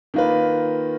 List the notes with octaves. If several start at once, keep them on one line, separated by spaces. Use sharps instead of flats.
D#3 A#3 F4 B4